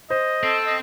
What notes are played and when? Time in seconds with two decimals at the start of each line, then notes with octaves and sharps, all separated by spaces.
0.10 C5 D#5
0.43 C4 A4
0.66 D#5